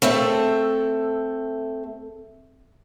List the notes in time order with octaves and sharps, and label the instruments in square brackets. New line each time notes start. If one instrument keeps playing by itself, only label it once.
[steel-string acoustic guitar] A3 C4 A4 E5